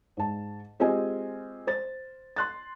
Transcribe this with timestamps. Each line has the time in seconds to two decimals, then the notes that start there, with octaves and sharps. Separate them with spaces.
0.17 G#2 A5
0.80 G#3 C4 F4 G4 D#5 G#5
1.67 C5 A6
2.36 C6 F#6 A6